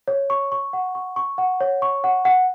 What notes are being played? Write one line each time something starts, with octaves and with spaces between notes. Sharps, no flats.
C#5
C#6
C#6
F#5
C#6
C#6
F#5
C#5
C#6
F#5
F#5